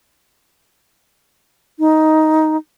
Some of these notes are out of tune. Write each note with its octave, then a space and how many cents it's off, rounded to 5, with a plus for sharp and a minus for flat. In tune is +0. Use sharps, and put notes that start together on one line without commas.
D#4 +10